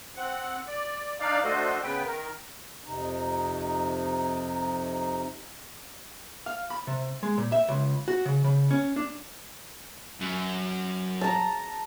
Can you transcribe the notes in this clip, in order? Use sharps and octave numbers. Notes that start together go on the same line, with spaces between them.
C4 F#5
D5
D4 D#4 D5 F5
A3 D4 F#4 A4 C5 D#5
C#3 B3 B4 G5
D#3 A#4
F2 C3 D#4
F5
B5
C3
G#3
A#2
E5
C#2
F#4
C#3
C#3
C#4
D4
F#2
A5 A#5